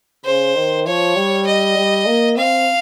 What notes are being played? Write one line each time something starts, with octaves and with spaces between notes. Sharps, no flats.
C#3 C5
D#3
F3 C#5
G3
D#5
G3
A#3
C4 F5